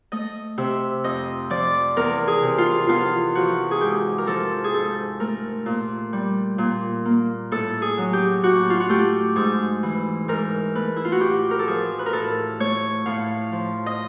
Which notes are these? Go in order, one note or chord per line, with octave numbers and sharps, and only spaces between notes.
A3 D#5
C3 E5
F2 D#5
F3 D5
E2 A#4
G#4
C3
F4
E2 F4
F3 F#4
G#4
G#2 G4
A#4
F3 A4
G#4
G#2 A4
A3 A#4
A#2
G3
A#2
A#3
A2 A4
G#4
F#3
G4
A2 F#4
F4
F#4
A3 G4
G#2 G#4
E3
G#2 A#4
A3 B4
E4
F4
F#4
A2 G4
A#4
A4
F3 G#4
B4
A#4
A2 A4
A3 C#5
A2 F5
F3
D#5